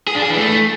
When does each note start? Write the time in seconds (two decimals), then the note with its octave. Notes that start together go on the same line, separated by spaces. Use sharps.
0.07 G#4
0.15 D4
0.22 G#4
0.30 E3
0.37 A3